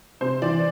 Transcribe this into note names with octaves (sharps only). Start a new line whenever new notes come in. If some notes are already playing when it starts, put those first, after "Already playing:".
C3 C5
E3 D5